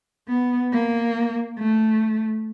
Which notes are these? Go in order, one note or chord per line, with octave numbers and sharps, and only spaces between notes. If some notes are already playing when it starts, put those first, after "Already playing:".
B3
A#3
A3